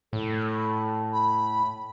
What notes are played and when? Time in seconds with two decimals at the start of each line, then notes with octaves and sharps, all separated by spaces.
0.13 A2 A4
1.13 B5